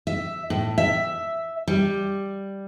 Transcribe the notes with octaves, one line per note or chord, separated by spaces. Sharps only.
E5
A2
E5
G3